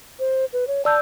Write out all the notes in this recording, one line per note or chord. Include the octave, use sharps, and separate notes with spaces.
C5
B4
C#5
D5 A5 E6 G6